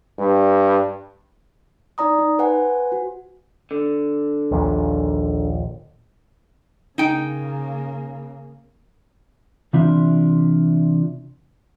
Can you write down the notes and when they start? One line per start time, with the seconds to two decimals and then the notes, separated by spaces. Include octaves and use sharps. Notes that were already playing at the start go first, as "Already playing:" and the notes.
0.19 G2
1.98 D#4 D5 A#5 D#6
2.19 D#4
2.39 B4 C5 F#5 G#5
2.92 F#4
3.71 D3
4.51 A#1 D#2 A#2
6.98 C#3 A#3 D#4 G5
9.73 C3 E3 C4 D4 F4 E5